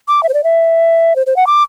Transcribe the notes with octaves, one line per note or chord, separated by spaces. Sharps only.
D6
E5
C5
D5
E5
C5
C5
F#5
D6